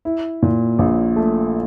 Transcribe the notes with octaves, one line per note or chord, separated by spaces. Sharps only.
E4
A#2
A#1
A3